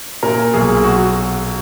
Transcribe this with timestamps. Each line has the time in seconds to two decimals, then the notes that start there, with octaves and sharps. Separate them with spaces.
0.23 A#2 A#4
0.54 B1 G#4
0.84 F#3 F#4